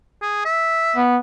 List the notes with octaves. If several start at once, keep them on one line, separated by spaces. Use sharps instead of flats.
G#4
E5
B3